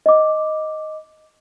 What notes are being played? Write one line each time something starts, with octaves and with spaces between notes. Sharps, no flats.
D#5 D6